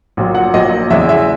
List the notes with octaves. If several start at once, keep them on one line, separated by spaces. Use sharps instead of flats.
A#1 A#2 F#3
F#5
A#1 A#2 F#3 D#5
E2 C#3 G#3 E5
E5